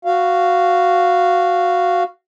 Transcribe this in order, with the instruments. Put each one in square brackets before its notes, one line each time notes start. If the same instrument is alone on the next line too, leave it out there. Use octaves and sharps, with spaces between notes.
[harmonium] F#4 F5